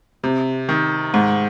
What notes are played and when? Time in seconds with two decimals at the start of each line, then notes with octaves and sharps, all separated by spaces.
0.24 C3
0.69 D#3
1.14 G#2